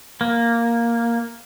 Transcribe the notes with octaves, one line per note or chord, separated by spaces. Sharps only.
A#3